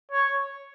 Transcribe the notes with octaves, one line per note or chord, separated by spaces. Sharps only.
C#5